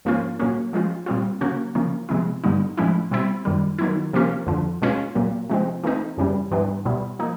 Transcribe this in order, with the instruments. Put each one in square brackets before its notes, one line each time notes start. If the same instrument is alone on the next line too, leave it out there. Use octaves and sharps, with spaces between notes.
[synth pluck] G#2 F3 A#3 C#4 F4
A#2 F#3 A#3 C#4
F3 G#3 C#4 F4
A#2 G3 C4 F4
C#3 F#3 A#3 C#4 F#4
C#3 F3 A#3 C#4
C3 F3 G#3 B3 E4
G2 D3 G3 B3 D#4
A2 F3 G#3 C#4 E4
B2 G3 C4 E4
F#2 D#3 G3
D#3 F#3 B3 E4
C3 F3 A#3 C#4 F4
F2 D3 F3
B2 G#3 C#4 F4
A#2 F#3 A#3
C3 F3 G#3 C4
E3 A3 C4 D#4
F#2 C#3 E3 G3
G#2 E3 G3 B3 D4
B2 G3 B3 E4
F3 A#3 D#4